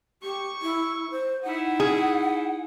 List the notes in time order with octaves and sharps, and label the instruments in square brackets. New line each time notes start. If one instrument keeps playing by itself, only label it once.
[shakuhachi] G4 [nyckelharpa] C#6
[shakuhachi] E4
C5
[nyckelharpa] D#4 E4 [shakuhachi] F#5
[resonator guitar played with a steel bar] G#4